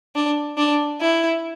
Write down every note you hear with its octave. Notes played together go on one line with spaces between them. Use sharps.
D4
D4
E4